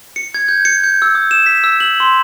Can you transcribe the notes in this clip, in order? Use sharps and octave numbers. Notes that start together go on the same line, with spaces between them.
C#7
G#6
G6
C#7
G6
E6
D#6
E7
B6
E6
F#7
C6